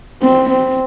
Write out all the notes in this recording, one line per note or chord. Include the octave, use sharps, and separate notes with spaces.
C4
C4